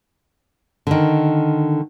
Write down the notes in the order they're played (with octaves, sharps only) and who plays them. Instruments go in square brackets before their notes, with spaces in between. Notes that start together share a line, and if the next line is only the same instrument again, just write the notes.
[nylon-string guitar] D3 D#3